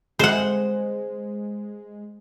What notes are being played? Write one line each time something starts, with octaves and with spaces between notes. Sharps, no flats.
G#3 C5 F#5